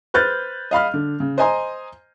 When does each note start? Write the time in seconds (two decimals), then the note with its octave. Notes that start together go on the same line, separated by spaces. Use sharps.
0.14 B4 C5 F6 G6 A6
0.71 D#5 F5 B5 F6
0.94 D3
1.20 C#3
1.38 C5 D#5 G#5 A#5 C6